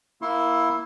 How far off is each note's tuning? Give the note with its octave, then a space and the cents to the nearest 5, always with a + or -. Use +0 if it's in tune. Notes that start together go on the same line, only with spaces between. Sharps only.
A#3 +15 E4 +0 C6 +30